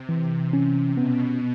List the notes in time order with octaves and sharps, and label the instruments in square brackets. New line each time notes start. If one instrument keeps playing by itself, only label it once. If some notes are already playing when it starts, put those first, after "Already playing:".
Already playing: [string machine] C3
[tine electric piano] E3
C#4
[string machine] B2 [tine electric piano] B3